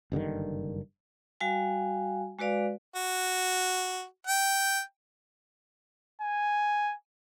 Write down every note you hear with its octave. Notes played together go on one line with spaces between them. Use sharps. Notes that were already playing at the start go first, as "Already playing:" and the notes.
F#1 G2 D3 D#3
G3 F#4 F5 G#5
G#3 F#4 B4 D5 F5
F#4
G5
G#5